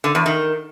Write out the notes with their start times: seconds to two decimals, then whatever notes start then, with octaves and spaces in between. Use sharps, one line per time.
0.04 D3
0.15 E2
0.26 D#3